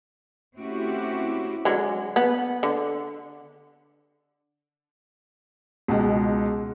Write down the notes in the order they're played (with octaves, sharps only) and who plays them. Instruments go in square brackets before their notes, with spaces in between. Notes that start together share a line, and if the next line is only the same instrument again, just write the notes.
[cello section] A3 C4 C#4 E4 F#4 G4
[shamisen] D3 F#3 G#3
B3
D3
[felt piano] C#2 B2 G#3